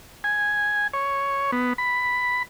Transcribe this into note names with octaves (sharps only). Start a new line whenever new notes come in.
G#5
C#5
B3
B5